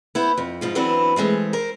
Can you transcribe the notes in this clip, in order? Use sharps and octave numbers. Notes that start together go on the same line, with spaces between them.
B3 E4 C5
F2
G#2 F3 F4
E3 F#3 B3 C4 D4 E4
E3 G#3 A3 C4
A#4 C5